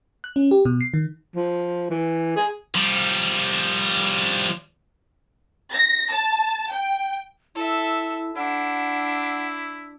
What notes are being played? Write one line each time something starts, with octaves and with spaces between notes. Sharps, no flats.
F#6
C#4
G4
B2
C7
D#3
F3
E3
G#4
F3 G3
A#6
A5
G5
E4 A4 E5
D4 E4 F#5